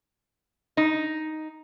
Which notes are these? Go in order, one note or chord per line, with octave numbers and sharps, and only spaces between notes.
D#4